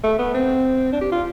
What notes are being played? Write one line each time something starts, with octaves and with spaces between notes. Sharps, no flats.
A3
B3
C4
D4
G4
F4